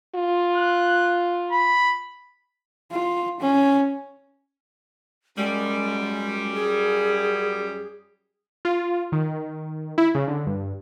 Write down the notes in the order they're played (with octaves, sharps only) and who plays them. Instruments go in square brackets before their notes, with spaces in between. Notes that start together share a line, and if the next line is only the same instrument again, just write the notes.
[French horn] F4
[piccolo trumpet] F#6
B5
[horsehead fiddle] F4
C#4
[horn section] F#2 G3 [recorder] G#3
[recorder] G#4
[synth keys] F4
D#3
E4
C#3
D3
G2